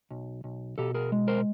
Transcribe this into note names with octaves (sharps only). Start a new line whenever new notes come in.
B1
B1
B2 G4 A4
G#4 A#4
G#3
A#4 C5